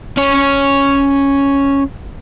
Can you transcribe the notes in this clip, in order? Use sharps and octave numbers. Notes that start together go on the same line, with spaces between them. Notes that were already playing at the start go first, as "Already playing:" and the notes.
C#4 C#5